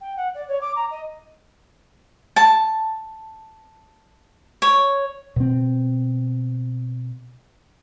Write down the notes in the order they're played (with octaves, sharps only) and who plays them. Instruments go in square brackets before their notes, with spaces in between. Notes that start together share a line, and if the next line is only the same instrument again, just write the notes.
[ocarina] G5
F#5
D5
C#5
D6
A#5
D#5
[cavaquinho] A5
C#5
[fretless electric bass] B2 C4